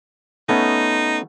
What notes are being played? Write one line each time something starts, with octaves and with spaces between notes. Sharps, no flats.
A3 B3 C#4 D#4